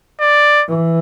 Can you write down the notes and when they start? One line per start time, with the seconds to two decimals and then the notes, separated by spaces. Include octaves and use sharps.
0.20 D5
0.69 E3